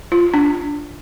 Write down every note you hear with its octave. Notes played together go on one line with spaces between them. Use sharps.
F4
D4